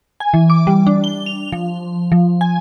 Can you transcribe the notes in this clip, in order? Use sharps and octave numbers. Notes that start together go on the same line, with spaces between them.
G#5
E3
D6
G3
D4
G7
F7
F3
F3
G#5